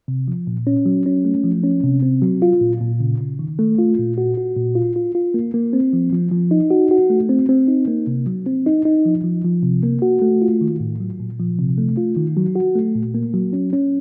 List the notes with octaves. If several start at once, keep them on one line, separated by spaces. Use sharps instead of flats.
C3
F3
A#2
C#4
F#3
C#4
A3
F3
C#4
C3
C4
F#3
F4
A#2
A#2
C#3
C#3
D#3
A3
F4
A#2
F#4
F#4
A#2
F4
F4
F4
A#3
A#3
C4
F3
F3
F3
D#4
F#4
F#4
A3
C4
C4
D#4
A#3
C3
F#3
C4
D#4
D#4
F3
F3
F3
C3
A#3
F#4
A3
F4
D#3
A2
F#3
A#2
F3
C3
A3
F4
D#3
F#3
F#4
A3
A#2
A#3
F#3
C#4
C#4